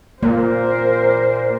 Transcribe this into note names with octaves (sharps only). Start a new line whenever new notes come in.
A#2 A#3 A#4 C5